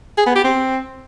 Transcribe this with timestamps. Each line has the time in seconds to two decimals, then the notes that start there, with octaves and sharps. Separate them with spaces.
0.18 G#4
0.26 B3
0.35 G4
0.44 C4